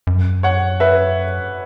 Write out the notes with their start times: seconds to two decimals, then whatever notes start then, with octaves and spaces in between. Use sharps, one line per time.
0.07 F#2
0.43 C#5 F#5
0.80 B4 E5